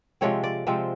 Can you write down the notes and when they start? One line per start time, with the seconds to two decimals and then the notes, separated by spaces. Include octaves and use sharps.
0.21 C3 F3 G#3 C4 C#5
0.44 D5
0.67 C3 F3 G#3 C4